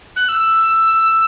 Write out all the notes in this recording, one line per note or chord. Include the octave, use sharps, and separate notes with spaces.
F#6
E6